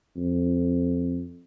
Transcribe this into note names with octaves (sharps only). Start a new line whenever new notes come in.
F2